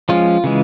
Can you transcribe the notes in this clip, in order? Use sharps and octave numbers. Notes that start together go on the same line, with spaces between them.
F3 G#3 C#4 F4
C#3 E3 G#3